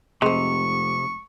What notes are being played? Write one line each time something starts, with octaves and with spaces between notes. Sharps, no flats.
F1 C3 G#3 C5 C#6